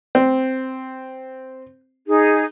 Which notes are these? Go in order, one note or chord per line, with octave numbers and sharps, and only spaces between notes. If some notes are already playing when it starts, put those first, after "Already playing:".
C4
D#4 G#4